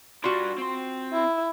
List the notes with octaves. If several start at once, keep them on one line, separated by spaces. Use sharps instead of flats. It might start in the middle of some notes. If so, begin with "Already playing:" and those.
G3 D4 F4 F#4
C4 C6
E4